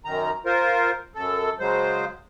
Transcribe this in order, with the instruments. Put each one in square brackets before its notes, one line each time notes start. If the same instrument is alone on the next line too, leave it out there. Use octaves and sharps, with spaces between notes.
[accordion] F#2 D#3 A#5
F4 A#4 C5
F#2 A4
C#3 F#3 G#3 C5